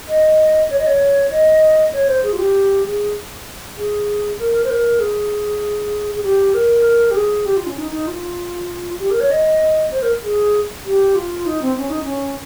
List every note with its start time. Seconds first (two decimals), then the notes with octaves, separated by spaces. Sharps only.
0.08 D#5
0.70 C#5
0.79 D#5
0.87 C#5
1.31 D#5
1.93 C#5
2.08 C5
2.23 G#4
2.33 F4
2.38 G4
2.86 G#4
3.77 G#4
4.39 A#4
4.64 C5
4.70 A#4
5.00 G#4
6.15 G#4
6.23 G4
6.54 A#4
7.11 G4
7.15 G#4
7.46 G4
7.57 F4
7.67 C#4
7.78 D#4
7.92 D#4
8.07 F4
9.00 G4
9.11 A#4
9.20 C#5
9.31 D#5
9.92 C5
10.02 A#4
10.23 G#4
10.85 G4
11.15 F4
11.46 D#4
11.62 C4
11.77 C#4
11.90 D#4
12.04 C#4